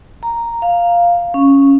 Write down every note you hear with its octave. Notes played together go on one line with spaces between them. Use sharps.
A#5
F5
C#4